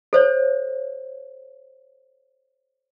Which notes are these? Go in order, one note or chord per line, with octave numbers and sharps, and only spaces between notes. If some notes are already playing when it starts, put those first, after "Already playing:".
A4 C5 C#5